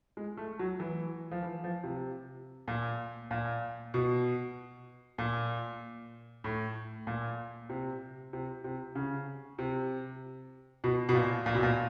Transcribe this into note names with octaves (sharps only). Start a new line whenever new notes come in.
G#3
A3
F#3
E3
F3
E3
F3
C3
A#2
A#2
B2
A#2
A2
A#2
C3
C3
C3
C#3
C3
B2
B2
A#2
A#2
B2
A#2